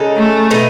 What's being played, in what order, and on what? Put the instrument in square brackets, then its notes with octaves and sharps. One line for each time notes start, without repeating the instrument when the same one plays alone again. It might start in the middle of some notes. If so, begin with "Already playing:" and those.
Already playing: [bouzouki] C#3 G#3 D#4 A4
[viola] A3
[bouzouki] B2 A3 D#4